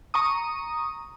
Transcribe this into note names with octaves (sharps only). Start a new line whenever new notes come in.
A#5 C#6 D#6